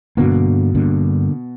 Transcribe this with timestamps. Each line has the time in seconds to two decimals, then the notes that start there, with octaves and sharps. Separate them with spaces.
0.17 G2 B2 D3 A#3
0.75 G2 D3 A#3